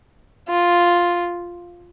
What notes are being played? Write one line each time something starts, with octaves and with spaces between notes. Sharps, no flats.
F4